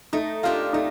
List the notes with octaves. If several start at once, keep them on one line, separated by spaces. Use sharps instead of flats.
A3 D#4
D4 F4 G4 A#4 F5
A3 D#4